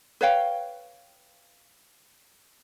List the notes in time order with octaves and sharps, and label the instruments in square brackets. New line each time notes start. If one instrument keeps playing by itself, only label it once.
[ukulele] B4 C#5 F5 G5